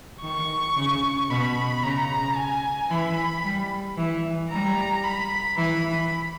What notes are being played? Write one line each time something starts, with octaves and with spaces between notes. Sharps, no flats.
D#3 C#6
C#3
B2 B5
C#3 A#5
G#5
E3 B5
G3
E3
G3 A#5
B5
E3 B5